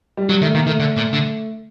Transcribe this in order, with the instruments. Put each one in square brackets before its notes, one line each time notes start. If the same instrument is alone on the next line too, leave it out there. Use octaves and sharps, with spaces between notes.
[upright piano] G3
[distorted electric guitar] F#3 [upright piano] G3
[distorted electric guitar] D#3 [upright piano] A3
[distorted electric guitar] D#3 [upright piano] A#3
[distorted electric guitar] D#3 [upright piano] A3
[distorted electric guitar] D3
A#2
D3